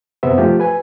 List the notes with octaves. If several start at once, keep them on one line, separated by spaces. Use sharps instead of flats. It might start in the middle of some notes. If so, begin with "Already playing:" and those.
F#2 C3 B3 C5 E5
F3 A3 F4 G4
B4 G#5